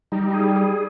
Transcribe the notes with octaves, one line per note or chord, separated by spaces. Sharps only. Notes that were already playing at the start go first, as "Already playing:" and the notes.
G3 D#4
G#4
G#4